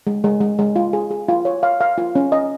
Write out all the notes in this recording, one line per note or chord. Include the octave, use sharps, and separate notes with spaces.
G#3
G#3
G#3
G#3
F4
G#4
G#4
F4
C#5
F5
F5
F4
C#4
D#5